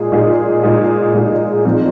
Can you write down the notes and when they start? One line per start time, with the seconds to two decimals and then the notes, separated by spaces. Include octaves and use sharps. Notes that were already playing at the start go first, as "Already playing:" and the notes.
Already playing: A#2 G#3 D#4 G#4
0.12 A#2 G#3 D#4 G#4
0.63 A#2 G#3 D#4 G#4
1.13 A#2 G#3 D#4 G#4
1.65 A#2 F3 G#3 C4 D#4